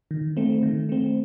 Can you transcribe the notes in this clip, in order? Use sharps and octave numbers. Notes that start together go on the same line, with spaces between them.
D#3
A3 C4
D#3
A3 C4